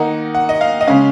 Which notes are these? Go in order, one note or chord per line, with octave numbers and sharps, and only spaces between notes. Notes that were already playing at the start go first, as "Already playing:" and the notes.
Already playing: D#3 A#3 D#4 F#5
F#5
D#5
F5
D#5
C#3 G#3 C#4 F5